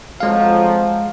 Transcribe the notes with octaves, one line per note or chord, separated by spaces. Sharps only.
F2 F3 F#3 G#3 F5